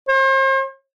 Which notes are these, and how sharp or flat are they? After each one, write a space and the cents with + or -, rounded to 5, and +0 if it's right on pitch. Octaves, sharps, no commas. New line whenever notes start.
C5 +40